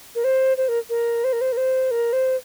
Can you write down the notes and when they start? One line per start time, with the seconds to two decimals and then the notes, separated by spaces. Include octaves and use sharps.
0.15 A#4
0.24 C5
0.57 C5
0.68 A#4
0.90 A#4
1.24 C5
1.33 A#4
1.41 C5
1.52 A#4
1.57 C5
1.91 A#4
2.13 C5